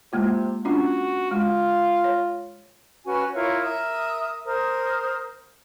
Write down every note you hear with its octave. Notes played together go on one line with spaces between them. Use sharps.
C3 G#3 A#3 F4
C#4 D4 F4 F#4
G#3 F4
C#5
C#4 F#4 B4 G#5
E4 F4 A#4 C#5
A#4 E5 D#6
A#4 C5 D#6